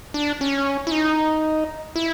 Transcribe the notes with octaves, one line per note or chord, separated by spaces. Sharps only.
D4
C#4
E4
D#4
E4